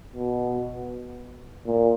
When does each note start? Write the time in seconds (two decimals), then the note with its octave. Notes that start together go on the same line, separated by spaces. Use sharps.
0.13 B2
1.66 A#2